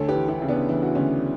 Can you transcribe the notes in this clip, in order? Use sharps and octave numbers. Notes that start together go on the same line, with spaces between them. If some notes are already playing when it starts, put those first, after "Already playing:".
Already playing: D2 A4 C#5
G4 B4
E3
E4 G4
C#3
B3 D4
E3 E4
F#4
D2 C#4 E4